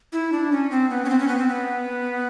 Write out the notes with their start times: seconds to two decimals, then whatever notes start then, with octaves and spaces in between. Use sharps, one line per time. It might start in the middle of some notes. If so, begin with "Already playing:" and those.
0.13 E4
0.32 D4
0.52 C#4
0.71 C4
0.90 B3
1.05 C#4
1.10 C4
1.19 C#4
1.28 B3
1.38 C4
1.49 B3